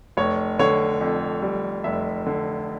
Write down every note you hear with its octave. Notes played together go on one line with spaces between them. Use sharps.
F1 C#5
D3 C#5
F2
G3
F1 E5
D3